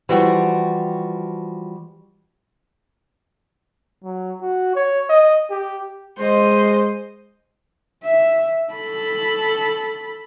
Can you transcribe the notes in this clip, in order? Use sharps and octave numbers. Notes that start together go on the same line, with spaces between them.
E3 F3 G3 F#4 G5
F#3
F#4
C#5
D#5
G4
G#3 C5 D#5
E5
A4 B5